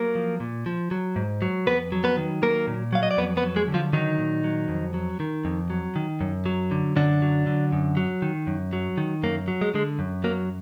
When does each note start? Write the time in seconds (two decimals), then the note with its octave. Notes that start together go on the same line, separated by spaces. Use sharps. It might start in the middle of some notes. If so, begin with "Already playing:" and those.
Already playing: F#3 A#3 A#4
0.15 F3
0.40 A#2
0.66 F3
0.91 F#3
1.16 G#2
1.42 F#3
1.66 F2 B3 B4
1.92 F#3
2.04 B3 B4
2.17 D#3
2.42 F#3 A#3 A#4
2.68 A#2
2.93 F#3 F5
3.03 D#5
3.11 D5
3.17 F2 B3 B4
3.37 B3 B4
3.43 F#3
3.56 G#3 G#4
3.68 D3
3.74 F3 F4
3.93 D#3 F#3 D#4
4.19 A#2
4.44 F#3
4.69 F2
4.94 F#3
5.20 D#3
5.45 F2
5.70 F#3
5.96 D#3
6.21 F#2
6.46 F#3
6.71 D3
6.96 F#2 D3 D4
7.22 F#3
7.47 D3
7.72 F#2
7.97 F#3
8.22 D#3
8.47 F#2
8.73 F#3
8.98 D#3
9.23 F#2 A#3
9.48 F#3
9.61 G#3
9.74 D3 G#3
9.99 F#2
10.24 F#3 A#3